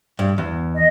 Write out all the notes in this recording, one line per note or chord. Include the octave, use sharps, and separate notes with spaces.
G2
E2
D#5